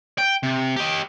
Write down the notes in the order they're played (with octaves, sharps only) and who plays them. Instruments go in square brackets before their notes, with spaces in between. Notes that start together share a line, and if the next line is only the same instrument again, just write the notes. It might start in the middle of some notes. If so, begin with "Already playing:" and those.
[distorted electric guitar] G5
C3
G4 D#5